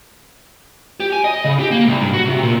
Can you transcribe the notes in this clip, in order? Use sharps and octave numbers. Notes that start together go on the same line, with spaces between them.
G4
G#5
D#5
C#3
G4
A#3
C2
G2
F#4
C3
A#2